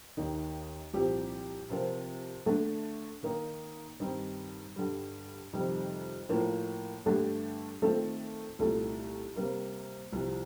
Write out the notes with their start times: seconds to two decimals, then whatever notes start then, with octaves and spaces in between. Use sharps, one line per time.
0.17 D#2 D#3 A#3 D#4
0.93 C2 A#2 F3 C4 G4
1.69 C3 F3 C4 F4 A#4
2.46 D3 A3 D4
3.23 D#3 A#3 D#4
4.00 G2 D#3 G3 C4 D#4
4.76 G2 D3 G3
5.53 F2 C3 D#3 G3
6.29 A2 F3 A#3 F4 A#4
7.06 G2 D3 A3 D4 G4
7.82 D#3 A3 C4 F4 A4
8.59 C2 A#2 A3 D#4 A4
9.36 C3 G3 A#3
10.13 C2 C3 F3